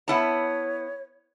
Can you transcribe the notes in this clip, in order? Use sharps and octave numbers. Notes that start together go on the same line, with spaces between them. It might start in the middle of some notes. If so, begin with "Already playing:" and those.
B3 E4 C#5 A5